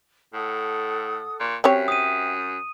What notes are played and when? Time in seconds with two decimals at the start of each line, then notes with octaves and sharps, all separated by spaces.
0.34 A2 A4 F#5 D#6
1.40 A#2 C#6
1.64 F#2 C4 G4 C#5 E5 G5
1.88 D#6 D#7